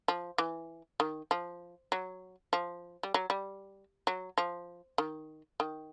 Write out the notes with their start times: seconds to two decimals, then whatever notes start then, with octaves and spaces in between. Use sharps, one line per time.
0.08 F3
0.38 E3
1.00 D#3
1.31 F3
1.92 F#3
2.53 F3
3.03 G3
3.14 F#3
3.30 G3
4.07 F#3
4.38 F3
4.98 D#3
5.60 D#3